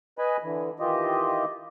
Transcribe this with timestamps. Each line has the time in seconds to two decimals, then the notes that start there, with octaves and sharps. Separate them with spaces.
0.18 B4 D#5 G#5 B5
0.43 D3 E3
0.80 D#3 E3 F4 G4 D#5